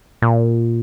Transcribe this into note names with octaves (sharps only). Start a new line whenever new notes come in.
A#2